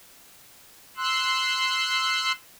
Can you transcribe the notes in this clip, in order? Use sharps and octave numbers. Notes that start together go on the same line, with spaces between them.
C6 E6 F#6